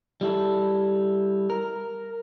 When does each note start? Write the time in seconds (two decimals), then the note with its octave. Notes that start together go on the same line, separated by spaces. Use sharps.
0.21 G3 E4 A4
1.50 A#4